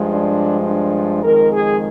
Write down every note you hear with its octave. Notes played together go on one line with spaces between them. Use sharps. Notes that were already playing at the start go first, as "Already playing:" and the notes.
Already playing: G2 F3 G#3
D4
D4
F2 D#3 G#3 A#4
G#4